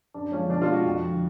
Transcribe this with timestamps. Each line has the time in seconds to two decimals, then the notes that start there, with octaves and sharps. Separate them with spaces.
0.14 F#2 D4
0.31 D3 F3 G#3 C#4
0.49 B2 D4
0.62 F4
0.68 G#3
0.73 F#4
0.85 F2
1.02 D3 F3